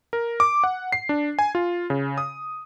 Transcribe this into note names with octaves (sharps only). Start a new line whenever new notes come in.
A#4
D6
F#5
C7
D4
G#5
F4
C#3
D#6